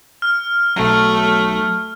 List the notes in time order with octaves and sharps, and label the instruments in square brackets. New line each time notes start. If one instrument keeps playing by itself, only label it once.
[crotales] F6
[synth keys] B1 F#3 [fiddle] A3